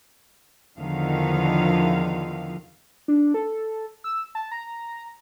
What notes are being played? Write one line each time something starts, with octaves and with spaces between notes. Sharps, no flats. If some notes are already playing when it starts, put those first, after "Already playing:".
E2 D3 D#3 F3 F5
D4
A4
E6
A5
A#5